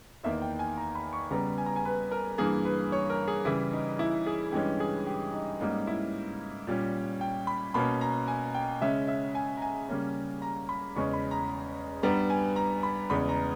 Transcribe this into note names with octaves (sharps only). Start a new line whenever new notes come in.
E2 D#3 A#3 E5
G5
G#5
A#5
B5
C#6
C#3 G3 B3 A#5
G#5
A#5
G#5
B4
A#4
G2 E3 A#3 G#4
B4
C#5
A#4
G#4
C#3 E3 G3 E4
D#4
E4
G#4
G2 E3 G#3 C#4 G4
G#4
G4
D#4
G#2 G3 A#3 C#4 D#4
E4
A#2 G3 C#4
G5
B5
B2 A#3 C#4 B5
A#5
G#5
G5
C#3 G#3 C#4 E5
E5
G#5
A#5
G#5
C#3 G3 A#3 C#4
A#5
B5
E2 C#3 G#3 C#4 C#6
B5
A#5
G2 G3 B3 A#5
G#5
A#5
B5
E2 C#3 G#3 B5
A#5